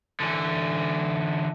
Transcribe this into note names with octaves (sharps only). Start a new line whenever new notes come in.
D3 E3